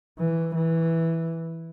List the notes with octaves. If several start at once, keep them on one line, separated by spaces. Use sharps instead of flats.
E3
E3